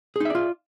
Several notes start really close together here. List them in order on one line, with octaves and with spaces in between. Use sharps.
G#4 D#4 E5 D5 F4